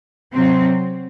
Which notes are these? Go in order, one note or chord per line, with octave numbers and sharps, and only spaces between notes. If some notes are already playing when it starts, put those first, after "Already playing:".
C3 F#3 C4